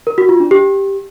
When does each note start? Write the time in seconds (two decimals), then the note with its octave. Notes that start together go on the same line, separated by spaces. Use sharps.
0.07 A#4
0.18 F#4
0.29 F4
0.40 D4
0.51 G4